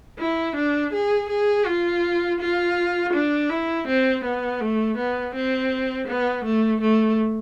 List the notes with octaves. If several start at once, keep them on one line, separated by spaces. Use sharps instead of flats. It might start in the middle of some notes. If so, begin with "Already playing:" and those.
E4
D4
G#4
G#4
F4
F4
D4
E4
C4
B3
A3
B3
C4
B3
A3
A3